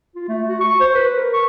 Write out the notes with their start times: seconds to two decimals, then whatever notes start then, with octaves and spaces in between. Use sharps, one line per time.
0.16 F4
0.28 A3
0.48 F#4
0.61 C#6
0.80 C5
0.94 B4
1.17 A#4
1.34 C#6